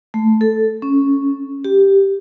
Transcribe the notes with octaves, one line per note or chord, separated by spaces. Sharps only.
A3
A4
C#4
G4